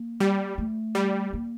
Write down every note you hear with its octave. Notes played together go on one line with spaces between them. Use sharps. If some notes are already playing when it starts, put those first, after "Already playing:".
Already playing: A#3
G3
A3
G3
A#3